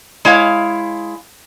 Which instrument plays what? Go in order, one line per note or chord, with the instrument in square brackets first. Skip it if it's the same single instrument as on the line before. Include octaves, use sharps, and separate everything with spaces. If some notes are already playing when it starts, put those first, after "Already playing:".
[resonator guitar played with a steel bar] G#3 E4 C#5 F5